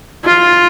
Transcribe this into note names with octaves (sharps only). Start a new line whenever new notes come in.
F4